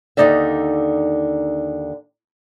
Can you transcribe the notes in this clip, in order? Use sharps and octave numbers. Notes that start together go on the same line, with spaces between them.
D#2 D3 G#3 D#4 D5 E5